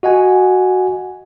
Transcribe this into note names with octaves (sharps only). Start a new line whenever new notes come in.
F#4 D#5 F#5 G#5